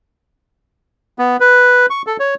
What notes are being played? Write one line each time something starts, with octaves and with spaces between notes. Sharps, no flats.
B3
B4
C#6
A4
C#5